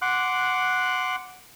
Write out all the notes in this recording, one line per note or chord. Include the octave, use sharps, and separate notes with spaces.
F#5 C6 D6 F#6